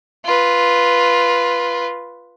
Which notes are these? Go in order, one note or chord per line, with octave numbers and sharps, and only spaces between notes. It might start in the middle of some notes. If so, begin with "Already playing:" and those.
F4 B4